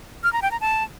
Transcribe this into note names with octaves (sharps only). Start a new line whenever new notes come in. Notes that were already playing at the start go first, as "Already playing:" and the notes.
F6
A#5
G5
A#5
A5